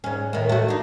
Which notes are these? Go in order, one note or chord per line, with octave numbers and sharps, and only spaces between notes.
G#2 C#4
A2 D#3
A3 F#4
D4 D#4